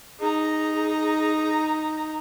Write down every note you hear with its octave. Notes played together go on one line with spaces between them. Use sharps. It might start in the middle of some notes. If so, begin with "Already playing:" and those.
D#4 G#4 A#5